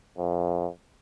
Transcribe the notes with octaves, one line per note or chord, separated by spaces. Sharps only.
F2